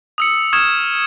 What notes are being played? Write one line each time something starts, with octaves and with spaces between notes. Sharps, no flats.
D#6 E6 C#7
C#6 D#6 F6 G#6 E7